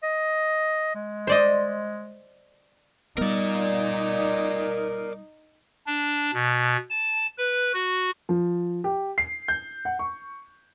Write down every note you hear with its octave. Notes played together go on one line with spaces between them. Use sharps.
D#5
G#3
C5 D5 D#5
G3 B3 D#4 A#4 D5
D4
B2
A5
B4
F#4
F3
G4
C7
G6
F#5
C#6